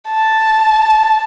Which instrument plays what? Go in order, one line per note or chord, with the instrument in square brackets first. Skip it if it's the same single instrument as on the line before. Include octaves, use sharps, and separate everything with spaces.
[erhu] A5